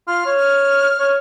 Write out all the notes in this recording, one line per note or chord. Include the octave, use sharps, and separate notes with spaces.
F4 F6
C#5
F6
C#5